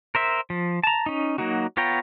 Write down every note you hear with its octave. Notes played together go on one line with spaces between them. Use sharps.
A#4 C5 E5
F3
A5 A#5
C#4 D#4
F#3 A#3 D#4 F#4
B3 F4 C#5 G5 A#5